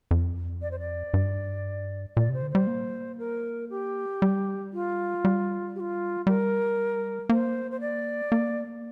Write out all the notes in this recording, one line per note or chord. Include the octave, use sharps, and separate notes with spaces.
F2
D5
C5
D5
G2
A#2 D5
C3 C5
D3
G3 C5
A#3
A#4
G4
G3
F4
G3
G4
F4
G3 A#4
A#3 C5
C5
D5
A#3